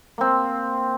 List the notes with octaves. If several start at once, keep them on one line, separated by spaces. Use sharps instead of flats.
A#3 C4